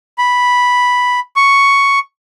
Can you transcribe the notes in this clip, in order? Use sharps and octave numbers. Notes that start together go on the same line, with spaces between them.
B5
C#6